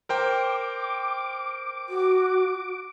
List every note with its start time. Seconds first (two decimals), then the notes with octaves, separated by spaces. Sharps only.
0.09 A#4 C5 G5 D6
1.89 F#4